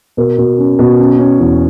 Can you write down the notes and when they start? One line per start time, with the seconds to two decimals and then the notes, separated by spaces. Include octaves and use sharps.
0.17 B2 A#4
0.38 B2
0.58 C#4
0.79 B2
0.99 C#4
1.19 C#4
1.39 E2